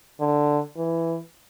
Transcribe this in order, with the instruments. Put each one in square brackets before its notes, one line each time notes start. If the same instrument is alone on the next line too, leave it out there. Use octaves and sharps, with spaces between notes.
[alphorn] D3
E3